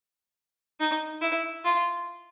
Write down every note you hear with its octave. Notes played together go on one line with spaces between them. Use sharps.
D#4
E4
F4